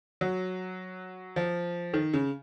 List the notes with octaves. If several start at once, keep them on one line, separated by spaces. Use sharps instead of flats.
F#3
F3
D#3
C#3